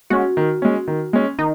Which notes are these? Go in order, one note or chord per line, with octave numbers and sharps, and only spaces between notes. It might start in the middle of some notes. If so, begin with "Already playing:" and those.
G#3 C#4 F#4
D#3
G#3 C#4
D#3
G#3 C#4
D#3 D#4